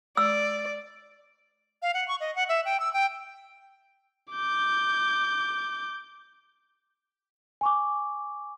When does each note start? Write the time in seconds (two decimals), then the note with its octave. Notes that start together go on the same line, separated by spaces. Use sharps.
0.17 D5 E6
1.82 F5
1.94 F#5
2.08 C#6
2.20 D#5
2.36 F#5
2.49 E5
2.65 G5
2.80 E6
2.93 G5
4.32 D6 G6
7.61 G#5 C#6 D6